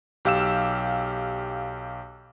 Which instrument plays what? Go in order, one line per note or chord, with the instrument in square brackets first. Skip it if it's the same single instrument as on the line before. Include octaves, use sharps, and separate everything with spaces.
[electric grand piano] B1 G4 F5 E6 E7